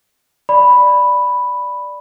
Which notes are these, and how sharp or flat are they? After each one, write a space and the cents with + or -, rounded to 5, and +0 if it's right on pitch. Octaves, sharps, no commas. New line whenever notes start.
D5 +0 B5 +0